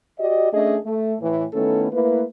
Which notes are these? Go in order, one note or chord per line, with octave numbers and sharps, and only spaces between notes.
F#4 G4 D5 D#5
A3 C#4 D4 G#4 D#5
A3
A2 E3
D#3 A3 B3 C#4 E4 A4
A3 A#3 E4 B4